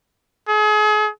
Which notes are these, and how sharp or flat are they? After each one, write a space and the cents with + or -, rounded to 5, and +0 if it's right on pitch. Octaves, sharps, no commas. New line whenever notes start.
G#4 +35